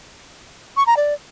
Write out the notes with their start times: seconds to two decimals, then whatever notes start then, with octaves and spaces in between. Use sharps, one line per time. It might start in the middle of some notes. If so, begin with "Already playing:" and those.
0.77 C#6
0.87 A#5
0.97 D5